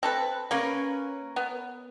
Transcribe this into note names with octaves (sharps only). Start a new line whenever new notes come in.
C4 A4 B4
A#3 C#4 A#4 B4
B3